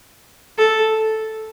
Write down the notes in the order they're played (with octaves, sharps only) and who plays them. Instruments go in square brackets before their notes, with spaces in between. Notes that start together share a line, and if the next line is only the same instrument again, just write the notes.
[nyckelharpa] A4